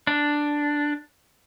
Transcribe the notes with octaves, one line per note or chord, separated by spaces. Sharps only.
D4